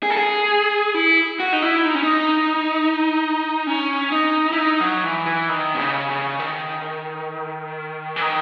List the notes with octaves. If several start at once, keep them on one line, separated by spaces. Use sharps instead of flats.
G#4
A4
G#4
E4
F#4
D#4
E4
D#4
C#4
D#4
C#4
D#4
E4
D#4
F#3
E3
E3
D#3
B2
C#3
C#3
D#3
E3
D#3